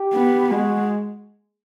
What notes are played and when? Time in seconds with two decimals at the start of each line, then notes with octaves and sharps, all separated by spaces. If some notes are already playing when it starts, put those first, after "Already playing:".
Already playing: G4
0.13 B3
0.50 G#3 F#4